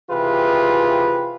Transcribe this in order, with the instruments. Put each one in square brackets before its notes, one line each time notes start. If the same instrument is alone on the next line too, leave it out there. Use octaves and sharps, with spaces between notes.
[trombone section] C3 E3 F4 G4 G#4 B4